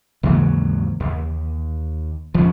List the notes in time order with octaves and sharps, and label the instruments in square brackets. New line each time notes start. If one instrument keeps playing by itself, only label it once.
[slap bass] D#2 G#2 F#3 [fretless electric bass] C#3 E3 A#3
[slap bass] D#2
[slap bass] D#2 C#4 [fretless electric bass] F3